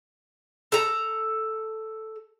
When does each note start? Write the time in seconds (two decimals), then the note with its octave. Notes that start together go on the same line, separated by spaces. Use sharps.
0.72 A4 A#5